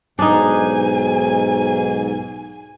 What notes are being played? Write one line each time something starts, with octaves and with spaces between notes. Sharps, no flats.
B1 G#2 D4 D#4 G#5